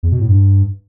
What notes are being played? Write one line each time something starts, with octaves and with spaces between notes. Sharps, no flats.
E2
B2
A2
G2